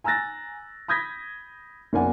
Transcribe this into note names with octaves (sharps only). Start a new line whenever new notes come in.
G#5 A#5 E6 F#6 A6 A#6
B5 D#6 G6 G#6 A#6 B6
F#1 B1 A#3 D5 F#5 G#5